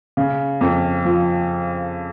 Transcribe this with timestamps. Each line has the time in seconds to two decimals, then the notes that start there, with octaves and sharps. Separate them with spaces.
0.17 C#3
0.61 F2
1.05 F3